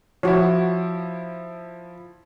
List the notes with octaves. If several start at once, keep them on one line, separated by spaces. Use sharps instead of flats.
F3 E4 F#4 C#5